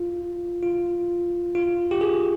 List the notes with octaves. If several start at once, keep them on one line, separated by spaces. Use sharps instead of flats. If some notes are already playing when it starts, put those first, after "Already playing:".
Already playing: F4
F4
F4
G4
G#4